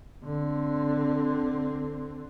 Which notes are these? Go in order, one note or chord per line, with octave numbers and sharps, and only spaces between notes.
D3 C4